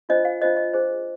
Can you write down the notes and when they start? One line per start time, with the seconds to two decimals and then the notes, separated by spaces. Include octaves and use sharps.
0.09 D4 F4 C5 D#5
0.25 F5
0.42 D4 F4 C5 D#5
0.57 D#5
0.74 D4 G#4 C5